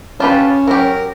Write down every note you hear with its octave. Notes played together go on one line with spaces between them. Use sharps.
C#4 F4 G4 B4 A5
F#3 G4 A#4